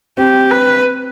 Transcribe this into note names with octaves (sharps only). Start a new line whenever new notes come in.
C4 G4
B4